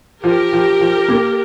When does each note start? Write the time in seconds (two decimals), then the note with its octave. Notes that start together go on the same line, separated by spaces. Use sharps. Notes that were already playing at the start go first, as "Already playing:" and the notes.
0.23 F3 G4 A#4
0.53 F3
0.81 F3
1.08 A#3